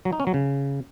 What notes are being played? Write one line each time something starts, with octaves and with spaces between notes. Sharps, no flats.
F#3
D#4
C#4
F#3
C#3